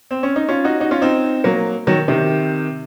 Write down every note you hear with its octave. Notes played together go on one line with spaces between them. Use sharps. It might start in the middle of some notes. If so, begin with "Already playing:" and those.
C4
C#4
D#4
C#4 F4
D#4 F#4
D#4 F#4
C#4 F4
C4 D#4
F#3 A#3
D#3 F#3
C3 D#3